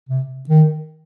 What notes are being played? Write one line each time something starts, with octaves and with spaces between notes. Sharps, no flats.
C3
D#3